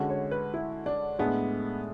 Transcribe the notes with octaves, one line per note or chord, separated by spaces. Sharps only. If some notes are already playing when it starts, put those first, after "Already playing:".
Already playing: D3 G#3 C#4 F#4
C#5
B4
E4
D4
A2 G#3 B3 D4 G#4